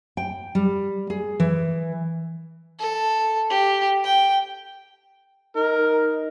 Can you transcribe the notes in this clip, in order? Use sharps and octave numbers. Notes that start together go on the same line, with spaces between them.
G5
G3
G#4
E3
A4
G4
G5
D#4 A#4